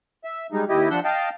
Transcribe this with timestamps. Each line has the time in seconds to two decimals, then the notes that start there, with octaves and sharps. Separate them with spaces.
0.24 E5
0.52 G3 G#3 D#4
0.69 D#2 E4 G4 D#5
0.90 F3 D4 F#5 E6 G6
1.05 D#5 F5 G5 A5